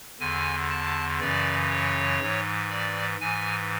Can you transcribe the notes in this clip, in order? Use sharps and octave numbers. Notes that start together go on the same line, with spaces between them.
E2 D3 G#5
A5
F#2 C#3 E3 D5
C#5
G#2 E3
D5
G#2 E3 G#5